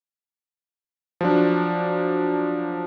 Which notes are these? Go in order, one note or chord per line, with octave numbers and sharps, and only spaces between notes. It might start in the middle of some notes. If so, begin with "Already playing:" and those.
F3 F#3 D4